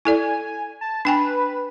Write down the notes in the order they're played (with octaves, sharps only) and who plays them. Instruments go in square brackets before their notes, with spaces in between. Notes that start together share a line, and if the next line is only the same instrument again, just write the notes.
[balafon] E4 A4 D5 [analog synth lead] G#5
[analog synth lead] A5
[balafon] D4 G5 G#5 [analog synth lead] B4